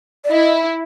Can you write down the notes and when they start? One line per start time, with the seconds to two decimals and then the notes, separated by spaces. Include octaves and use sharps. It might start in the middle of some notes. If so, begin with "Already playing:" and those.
0.24 D5
0.31 E4 D#5